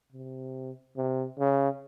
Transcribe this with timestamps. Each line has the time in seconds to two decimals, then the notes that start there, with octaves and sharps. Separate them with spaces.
0.12 C3
0.97 C3
1.39 C#3